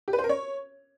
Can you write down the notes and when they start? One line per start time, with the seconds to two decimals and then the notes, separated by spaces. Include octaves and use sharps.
0.08 G4
0.13 B4
0.18 C5
0.24 A#4
0.29 C#5